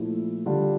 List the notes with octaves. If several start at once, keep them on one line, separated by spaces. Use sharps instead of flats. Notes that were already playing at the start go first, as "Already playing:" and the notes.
Already playing: A#2 F3 A3 E4
D3 G3 D4 F4